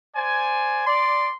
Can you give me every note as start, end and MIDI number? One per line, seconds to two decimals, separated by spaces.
0.15 0.83 72
0.15 0.83 74
0.15 0.83 80
0.87 1.29 74
0.87 1.34 84